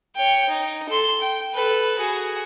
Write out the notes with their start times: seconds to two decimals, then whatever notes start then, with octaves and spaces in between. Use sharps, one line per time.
0.16 C#5 G5
0.49 D#4
0.89 A4 C6
1.21 G5
1.54 A4 B4
1.99 F#4 G#4